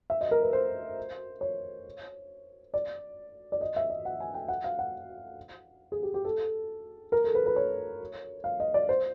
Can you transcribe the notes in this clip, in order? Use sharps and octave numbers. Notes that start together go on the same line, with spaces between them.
E5
D#5
A#4
B4
C5
C#5
D5
D5
D#5
E5
D#5
F#5
G#5
G5
F#5
F5
F#5
G#4
G4
G4
A4
A#4
A4
B4
B4
C#5
F5
D#5
D5
C5